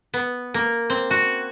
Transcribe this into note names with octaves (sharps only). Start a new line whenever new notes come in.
B3
A#3
C4
F#4